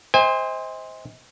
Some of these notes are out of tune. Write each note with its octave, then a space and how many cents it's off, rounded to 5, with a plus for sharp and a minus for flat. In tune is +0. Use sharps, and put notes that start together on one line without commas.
C5 +0 D#5 +35 G#5 -45